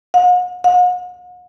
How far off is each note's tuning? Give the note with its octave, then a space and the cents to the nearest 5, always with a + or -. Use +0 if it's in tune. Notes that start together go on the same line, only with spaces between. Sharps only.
F#5 -45
F#5 -45